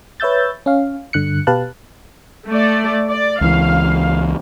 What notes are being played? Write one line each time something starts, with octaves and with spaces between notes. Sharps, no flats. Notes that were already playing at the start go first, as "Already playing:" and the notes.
B4 C#5 E5 E6 G6 A6
C#4 F5
G2 D3 F#6 C#7
B2 G4 B4 F5 A5 F#6
A3 D5
D5
C#2 E3 F5